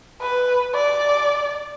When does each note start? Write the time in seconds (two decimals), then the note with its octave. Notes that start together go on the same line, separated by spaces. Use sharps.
0.21 B4
0.74 D5